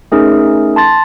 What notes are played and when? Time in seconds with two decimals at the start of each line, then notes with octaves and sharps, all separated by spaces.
0.12 A3 C#4 D#4 G#4 A#4
0.76 A5 C6 A6